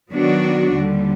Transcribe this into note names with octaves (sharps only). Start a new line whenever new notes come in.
D#3 F#3 B3 D4 F#4
D#2 D3 G3